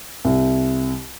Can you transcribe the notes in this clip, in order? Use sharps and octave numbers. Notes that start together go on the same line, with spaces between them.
C2